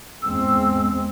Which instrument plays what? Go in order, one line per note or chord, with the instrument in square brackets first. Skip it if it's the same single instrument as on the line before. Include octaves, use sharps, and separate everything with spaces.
[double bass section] E2 G#3 C4 [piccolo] E6